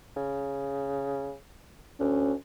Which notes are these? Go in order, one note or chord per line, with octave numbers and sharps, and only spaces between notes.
C#3
D2 C#4